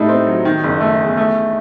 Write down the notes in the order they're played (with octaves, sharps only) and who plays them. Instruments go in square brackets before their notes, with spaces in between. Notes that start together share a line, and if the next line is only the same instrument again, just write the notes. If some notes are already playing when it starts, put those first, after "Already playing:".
Already playing: [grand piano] A2 G3 A3 [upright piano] D#4
[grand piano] C4
F#3
D#3
F#1
A3
E2
A3